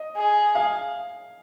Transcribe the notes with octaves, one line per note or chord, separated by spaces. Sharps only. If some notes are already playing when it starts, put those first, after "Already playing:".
Already playing: D#5
G#4
F5